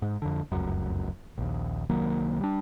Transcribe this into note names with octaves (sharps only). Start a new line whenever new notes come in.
G#2
F2 D3
F1 C#2 F#2
A#1 D#2
C2 D#3 F#3 A#3
G3 D4